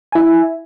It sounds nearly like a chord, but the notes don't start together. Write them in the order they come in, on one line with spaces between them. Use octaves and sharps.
G#5 E4 E5